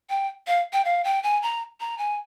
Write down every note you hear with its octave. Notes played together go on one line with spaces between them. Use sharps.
G5
F5
G5
F5
G5
G#5
A#5
A#5
G#5